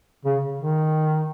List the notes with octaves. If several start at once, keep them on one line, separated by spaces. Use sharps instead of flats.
C#3
D#3